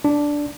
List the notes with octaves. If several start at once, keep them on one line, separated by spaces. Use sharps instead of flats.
D4